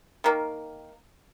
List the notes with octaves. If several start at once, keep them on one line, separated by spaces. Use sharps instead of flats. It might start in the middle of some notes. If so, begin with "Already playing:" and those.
D#3 A#3